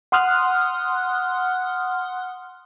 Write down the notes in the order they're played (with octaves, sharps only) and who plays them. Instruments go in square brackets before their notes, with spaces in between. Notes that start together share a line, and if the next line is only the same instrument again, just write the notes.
[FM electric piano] F#5 C6 D#6 F6 F#6